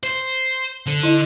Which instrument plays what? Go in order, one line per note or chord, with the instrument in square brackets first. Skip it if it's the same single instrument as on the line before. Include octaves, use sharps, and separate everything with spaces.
[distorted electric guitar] C5
[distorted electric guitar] D3 [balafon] C5
[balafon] E4 D#5